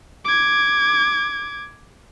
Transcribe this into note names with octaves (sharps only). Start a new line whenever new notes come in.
D6 G#6